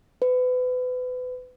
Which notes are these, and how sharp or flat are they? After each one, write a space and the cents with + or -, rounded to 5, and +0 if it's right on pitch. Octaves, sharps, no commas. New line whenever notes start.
B4 +30